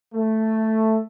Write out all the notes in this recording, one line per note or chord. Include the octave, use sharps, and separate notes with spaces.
A3